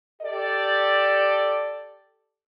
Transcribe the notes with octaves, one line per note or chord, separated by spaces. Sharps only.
G4 A4 D5